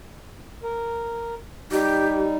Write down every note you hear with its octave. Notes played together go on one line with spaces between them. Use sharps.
A#4
G3 D#4 G4